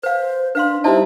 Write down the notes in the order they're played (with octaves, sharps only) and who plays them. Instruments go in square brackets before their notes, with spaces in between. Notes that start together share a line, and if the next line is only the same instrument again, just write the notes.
[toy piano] B4 F5 [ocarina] C5
[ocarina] D4 [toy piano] B4 F5 C6
[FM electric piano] G3 C4 D#4 [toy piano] E4 D5 A5 [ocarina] E5